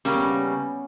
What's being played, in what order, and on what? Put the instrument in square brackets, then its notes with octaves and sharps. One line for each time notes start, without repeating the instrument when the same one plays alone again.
[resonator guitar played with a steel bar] C#3 G3 A#3 [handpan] C#4
[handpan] B3
C#4